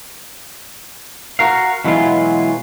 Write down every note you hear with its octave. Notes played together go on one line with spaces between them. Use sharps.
F#4 A#4 F5
B2 E3 F#3 G#3 E4 F4